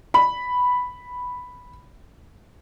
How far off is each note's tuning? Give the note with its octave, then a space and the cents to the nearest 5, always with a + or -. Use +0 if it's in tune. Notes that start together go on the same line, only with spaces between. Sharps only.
B5 +0